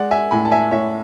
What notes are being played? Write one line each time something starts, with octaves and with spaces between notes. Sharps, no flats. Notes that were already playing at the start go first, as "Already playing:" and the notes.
Already playing: G#3 D5 F#5
E5 G#5
A2 G#5 B5
A5
E5 G#5
A2 C#5 E5